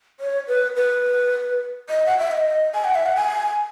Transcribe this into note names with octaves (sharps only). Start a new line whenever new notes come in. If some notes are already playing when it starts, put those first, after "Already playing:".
C#5
B4
B4
D#5
F#5
E5
D#5
G#5
F#5
E5
F#5
G#5